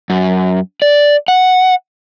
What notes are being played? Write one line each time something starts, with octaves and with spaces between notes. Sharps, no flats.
F#2
D5
F#5